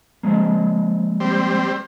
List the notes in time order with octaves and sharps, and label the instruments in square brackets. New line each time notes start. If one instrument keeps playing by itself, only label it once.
[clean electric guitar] F3 G#3 A#3
[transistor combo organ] G3 C4